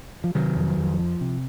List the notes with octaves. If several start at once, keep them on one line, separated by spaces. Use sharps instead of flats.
F3
C3 D#3 F#3
F2
F2
F3
C3